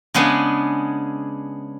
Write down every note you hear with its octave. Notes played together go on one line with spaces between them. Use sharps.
C#3 G#3 B3 D4